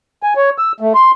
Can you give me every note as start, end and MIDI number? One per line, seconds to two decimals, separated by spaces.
0.23 0.34 80
0.36 0.50 73
0.58 0.72 88
0.80 0.93 57
0.95 1.11 84